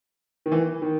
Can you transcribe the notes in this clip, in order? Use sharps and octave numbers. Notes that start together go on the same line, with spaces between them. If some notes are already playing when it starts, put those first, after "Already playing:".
D#3
E3
D#3